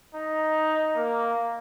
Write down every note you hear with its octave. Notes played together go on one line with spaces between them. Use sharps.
D#4
A#3